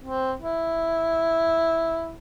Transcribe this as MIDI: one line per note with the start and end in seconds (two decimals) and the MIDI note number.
0.04 0.33 60
0.40 2.15 64